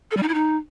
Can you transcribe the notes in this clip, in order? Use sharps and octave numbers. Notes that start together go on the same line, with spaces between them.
A4
G3
D#4
E4
D#4